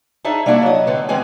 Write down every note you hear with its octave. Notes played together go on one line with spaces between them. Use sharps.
D4 D#4 G#4 E5 A5
G3 A#3 D4 E4 F#4 A4
F#3 D#5
A2 D3 B3
E3 G#3 B3 C4 F4 G#5